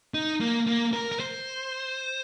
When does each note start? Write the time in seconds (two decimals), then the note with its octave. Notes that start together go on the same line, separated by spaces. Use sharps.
0.14 D#4
0.40 A#3
0.67 A#3
0.93 A#4
1.12 A#4
1.20 C5